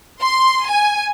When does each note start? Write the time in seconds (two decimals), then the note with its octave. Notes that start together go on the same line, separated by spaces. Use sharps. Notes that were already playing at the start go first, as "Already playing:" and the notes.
0.22 C6
0.68 G#5